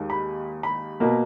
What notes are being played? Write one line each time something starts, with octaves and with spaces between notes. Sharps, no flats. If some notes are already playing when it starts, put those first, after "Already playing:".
Already playing: D#2 D#3 G#3
B5
B5
B2 A#3